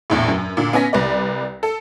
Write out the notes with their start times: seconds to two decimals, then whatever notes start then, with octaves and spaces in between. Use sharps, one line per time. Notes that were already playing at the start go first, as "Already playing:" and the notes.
0.10 A#1 E2 A2
0.28 F#2
0.57 A#2 D3
0.73 B3 C#4 G#5 A#6 B6
0.93 C2 B4 D5
1.63 A4